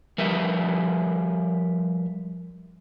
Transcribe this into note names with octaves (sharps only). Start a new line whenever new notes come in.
F3 G3 A#4 B4 E5